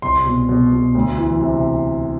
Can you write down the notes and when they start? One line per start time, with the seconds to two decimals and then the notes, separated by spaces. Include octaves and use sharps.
0.02 C2 C6
0.26 B2
0.49 B2
0.72 B2
0.95 D2
1.18 E3
1.41 C3